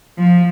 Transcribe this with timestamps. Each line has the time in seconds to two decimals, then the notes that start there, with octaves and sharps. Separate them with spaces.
0.18 F3